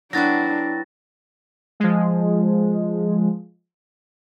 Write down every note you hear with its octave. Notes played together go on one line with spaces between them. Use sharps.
F#3 B3 D4 E4 F#4 G5 A6 A#6
F3 G#3